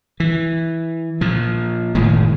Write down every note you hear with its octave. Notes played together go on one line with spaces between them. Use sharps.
E3
A#2 F3
F#1 A2 D#3 G#3